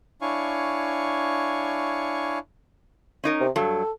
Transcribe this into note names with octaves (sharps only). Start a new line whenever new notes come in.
D4 E4 C#5 F5 G#5 C#6
C#4 D#4 A#4
C3
G2 F#3 A4